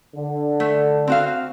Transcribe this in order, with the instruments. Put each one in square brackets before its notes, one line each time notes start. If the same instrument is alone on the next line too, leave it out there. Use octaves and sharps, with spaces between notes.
[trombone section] D3
[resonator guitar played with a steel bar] A3
C4 F#4 F5